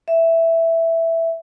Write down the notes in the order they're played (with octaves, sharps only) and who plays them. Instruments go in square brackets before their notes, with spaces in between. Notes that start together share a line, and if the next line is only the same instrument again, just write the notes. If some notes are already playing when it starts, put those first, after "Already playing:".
[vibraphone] E5